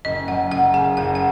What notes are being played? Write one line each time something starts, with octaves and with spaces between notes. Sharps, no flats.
F#1 D#5
F#2 F#5
F#1 F#5
C#3 G#5
F#1 F#5
F#5